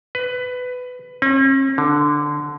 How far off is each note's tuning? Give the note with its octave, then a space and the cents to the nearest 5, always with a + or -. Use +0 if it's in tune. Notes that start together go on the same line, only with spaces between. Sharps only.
B4 +15
C#4 -45
D3 +5